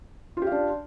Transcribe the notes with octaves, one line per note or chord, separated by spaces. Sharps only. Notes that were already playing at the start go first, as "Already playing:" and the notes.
D4 F4 G4 F5